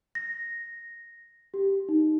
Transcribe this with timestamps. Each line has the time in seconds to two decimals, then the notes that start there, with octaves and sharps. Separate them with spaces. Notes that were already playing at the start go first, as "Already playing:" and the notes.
0.15 A#6
1.54 G4
1.89 D#4